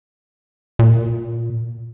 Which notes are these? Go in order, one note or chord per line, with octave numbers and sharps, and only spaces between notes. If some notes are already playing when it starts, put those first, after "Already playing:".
A#2